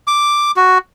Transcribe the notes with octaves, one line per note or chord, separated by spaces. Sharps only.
D6
F#4